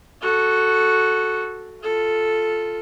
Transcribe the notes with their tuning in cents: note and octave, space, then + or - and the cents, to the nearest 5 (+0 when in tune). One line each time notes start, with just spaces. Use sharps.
F#4 +0 A4 +0
F4 +0 A4 +0